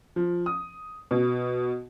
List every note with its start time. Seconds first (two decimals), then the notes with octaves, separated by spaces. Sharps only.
0.16 F3
0.46 D#6
1.11 B2